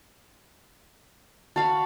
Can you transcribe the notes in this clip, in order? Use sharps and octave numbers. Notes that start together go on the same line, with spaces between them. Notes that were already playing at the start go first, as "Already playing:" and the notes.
F#4 F5 A5 B5